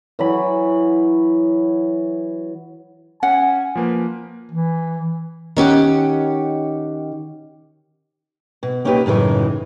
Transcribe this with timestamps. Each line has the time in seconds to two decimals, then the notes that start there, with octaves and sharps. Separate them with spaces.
0.19 E3 F#3 B5
3.23 C#4 F#5 G#5
3.75 F3 A#3 B4
4.51 E3
5.57 D#3 C#4 G4 F#5
8.63 B2
8.85 A#3 C#4 D#4 E4 G4 B4
9.06 F#2 A2 C#3 E3 D#4